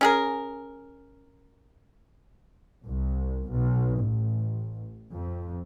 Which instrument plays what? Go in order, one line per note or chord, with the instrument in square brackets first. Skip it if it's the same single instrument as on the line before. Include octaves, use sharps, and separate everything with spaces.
[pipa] C#4 G#4 A#4
[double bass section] C2
B1
A1
F2